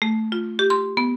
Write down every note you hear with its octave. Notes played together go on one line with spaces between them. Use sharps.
A3
F4
G4
C6
B3